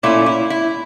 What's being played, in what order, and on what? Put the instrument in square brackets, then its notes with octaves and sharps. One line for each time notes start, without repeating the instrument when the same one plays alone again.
[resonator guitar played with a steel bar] A#2 A3 C#4 E4
E4
E4